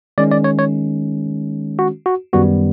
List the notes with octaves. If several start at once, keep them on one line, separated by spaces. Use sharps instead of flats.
D#3 G#3 C#4 D5
D5
C#5
C#5
F#4
F#4
F#2 D#3 G3 B3 F#4